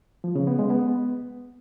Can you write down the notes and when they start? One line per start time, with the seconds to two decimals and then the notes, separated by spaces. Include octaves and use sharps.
0.24 F3
0.36 C#3
0.47 B3
0.59 G#3
0.70 B3